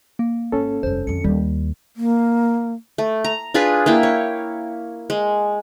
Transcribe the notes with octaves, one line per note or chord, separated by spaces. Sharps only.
A#3
G#1 C#4 A4
F1 G2 C5
F2 D3 C#7
D#2 G3 E4
A#3
A3
A#5
D4 F4 G#4 B4
A#3 E4 G5
C#5
G#3